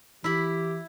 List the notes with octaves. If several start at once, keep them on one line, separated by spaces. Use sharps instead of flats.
E3 E4 G4 B5